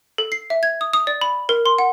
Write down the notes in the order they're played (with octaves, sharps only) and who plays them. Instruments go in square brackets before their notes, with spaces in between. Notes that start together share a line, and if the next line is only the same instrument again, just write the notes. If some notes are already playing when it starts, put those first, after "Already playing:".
[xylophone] A4
C7
E5
G#6
D#6
D#6
D5
B5
A#4
C6
F#5